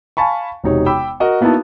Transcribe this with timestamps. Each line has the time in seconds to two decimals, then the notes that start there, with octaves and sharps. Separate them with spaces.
0.17 F5 G#5 A5 B5 C#6
0.64 E1 C3 D#4 C#5
0.86 G5 B5 D6 E6
1.20 F#4 A#4 D#5
1.41 A#3 B3 D#4 E4 F#4 A5